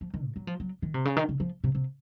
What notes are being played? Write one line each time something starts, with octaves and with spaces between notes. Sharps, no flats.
F3
D#3
A2
F#3
F3
F#3
D#3
C3
C#3
D#3
C#3
F3
C3
C3